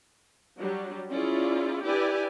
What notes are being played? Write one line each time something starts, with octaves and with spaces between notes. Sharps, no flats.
F#3 G3 D4
C#4 E4 F4 G#4 D5
D4 E4 G4 B4 D5 G#5